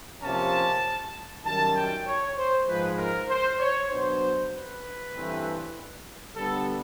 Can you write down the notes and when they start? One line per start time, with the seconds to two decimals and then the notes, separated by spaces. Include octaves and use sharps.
0.21 C3 F3 A#3 C#4 A5
1.44 F#2 D#3 G3 A5
1.75 G5
2.05 C#5
2.37 C5
2.66 G#2 F3 G#3 B4
2.97 A#4
3.28 C5
3.59 C#5
3.89 B2 F#3 B3 D4 C5
4.51 B4
5.12 G2 E3 A3 C4
6.35 D3 G3 B3 D4 A4